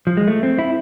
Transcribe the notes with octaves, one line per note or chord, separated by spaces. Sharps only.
F3
G#3
A3
C4
E4